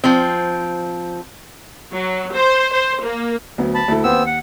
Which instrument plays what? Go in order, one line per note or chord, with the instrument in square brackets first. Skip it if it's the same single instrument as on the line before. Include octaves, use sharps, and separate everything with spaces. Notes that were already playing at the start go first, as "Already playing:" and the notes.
[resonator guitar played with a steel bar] F3 C4
[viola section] F#3
C5
C5
A#3
[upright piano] D2 F#3 B3
[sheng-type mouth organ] A5 B5
[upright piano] D2 E4 A4
[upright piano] D#2 [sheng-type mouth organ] B3 C4 E6
[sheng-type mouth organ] F#5